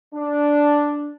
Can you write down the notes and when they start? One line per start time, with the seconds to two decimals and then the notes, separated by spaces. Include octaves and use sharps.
0.14 D4